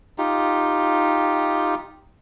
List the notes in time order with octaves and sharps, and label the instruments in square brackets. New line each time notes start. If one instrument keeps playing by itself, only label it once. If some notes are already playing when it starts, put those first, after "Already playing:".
[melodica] D#4 F4 G4